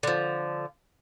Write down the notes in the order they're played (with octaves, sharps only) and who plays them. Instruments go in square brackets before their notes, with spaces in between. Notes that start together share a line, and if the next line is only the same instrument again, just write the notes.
[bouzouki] D3 F3